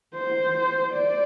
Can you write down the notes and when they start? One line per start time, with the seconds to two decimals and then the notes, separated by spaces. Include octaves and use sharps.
0.15 C5
0.93 D5